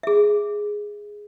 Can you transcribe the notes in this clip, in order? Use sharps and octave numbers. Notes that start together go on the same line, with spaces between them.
G#4 E5